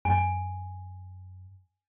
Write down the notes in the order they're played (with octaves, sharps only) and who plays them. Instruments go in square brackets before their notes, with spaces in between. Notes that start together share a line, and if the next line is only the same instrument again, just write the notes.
[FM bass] F#2 [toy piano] G#5